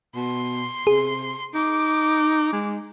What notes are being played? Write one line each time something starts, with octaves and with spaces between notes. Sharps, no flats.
B2 C6
C3 G#4
D#4 D6
G#3